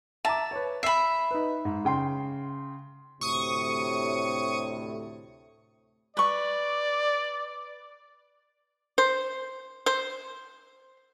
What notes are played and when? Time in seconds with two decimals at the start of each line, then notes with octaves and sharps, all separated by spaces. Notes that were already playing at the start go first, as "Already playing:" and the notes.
0.25 E5 A5 A#5 D6
0.51 B4 C#5
0.83 E5 B5 C7
1.31 D#4 B4
1.65 G#2
1.85 C#3 G5 C6
3.21 D2 A2 C3 C#6 D#6
6.17 B4 D5 C#6
8.98 C5
9.86 C5